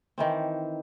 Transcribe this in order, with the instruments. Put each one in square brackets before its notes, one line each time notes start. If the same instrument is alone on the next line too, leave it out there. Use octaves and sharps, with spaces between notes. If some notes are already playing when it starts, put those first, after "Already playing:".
[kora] D#3 E3 C4